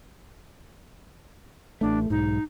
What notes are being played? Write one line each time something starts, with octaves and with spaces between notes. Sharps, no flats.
A1 A3 D4
B1 G#2 D#4